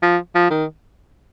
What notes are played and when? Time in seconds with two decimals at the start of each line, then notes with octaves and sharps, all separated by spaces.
0.02 F3
0.35 F3
0.50 D#3